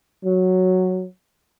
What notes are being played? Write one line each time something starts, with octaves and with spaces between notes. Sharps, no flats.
F#3